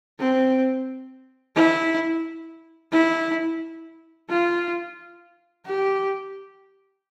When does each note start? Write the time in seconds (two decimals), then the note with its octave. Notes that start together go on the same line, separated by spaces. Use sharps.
0.20 C4
1.56 E4
2.92 E4
4.29 F4
5.66 G4